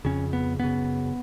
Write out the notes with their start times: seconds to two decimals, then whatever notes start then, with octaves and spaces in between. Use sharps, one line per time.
0.05 F2 C#3 C#4
0.33 B3
0.59 F#2 C#3 B3